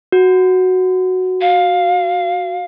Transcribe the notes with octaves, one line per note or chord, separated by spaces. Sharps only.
F#4
F5